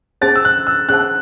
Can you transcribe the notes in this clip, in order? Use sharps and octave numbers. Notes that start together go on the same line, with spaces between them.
C#4 G#4 C5 F#5 A5 A6
E6
F#6
E6
C#4 G#4 C5 F#5 A5 F#6